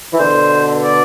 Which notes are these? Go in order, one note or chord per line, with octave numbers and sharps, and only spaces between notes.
E3
B2 D3 C5
D5